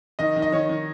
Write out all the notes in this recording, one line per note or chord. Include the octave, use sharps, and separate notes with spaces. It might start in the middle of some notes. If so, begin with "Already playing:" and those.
D#3 D#5
D#3
D#5
D#3 C#5
D#3